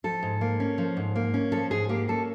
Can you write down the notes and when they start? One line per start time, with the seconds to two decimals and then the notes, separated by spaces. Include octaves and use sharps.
0.04 F3 A4
0.23 G#2
0.41 A#3
0.60 C#4
0.78 F3
0.97 G#2
1.16 A#3
1.34 C#4
1.52 F3 A4
1.71 G#2 G#4
1.89 A#3 G4
2.08 C#4 A4